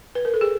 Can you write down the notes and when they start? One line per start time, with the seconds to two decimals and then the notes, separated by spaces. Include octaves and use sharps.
0.15 B4
0.25 A#4
0.34 A4
0.41 G#4